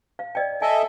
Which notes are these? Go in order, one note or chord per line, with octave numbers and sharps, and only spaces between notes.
F5
D5 D#5 G5
A4 D#5 E5 G#5